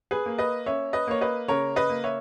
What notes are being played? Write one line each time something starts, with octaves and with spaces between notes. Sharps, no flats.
G#4 B4
A#3
B4 D#5
C#4 C#5 E5
B4 D#5
A#3 C#5
B4 D#5
C#3 A#4 C#5
B4 D#5
A#3
C#5 E5